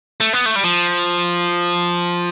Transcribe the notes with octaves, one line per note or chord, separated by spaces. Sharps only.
A3
B3
A3
G3
F3